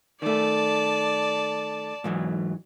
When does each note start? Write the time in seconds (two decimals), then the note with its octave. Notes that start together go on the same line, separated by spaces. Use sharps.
0.22 D#3 A3 D5 A5
2.04 G#2 E3 F#3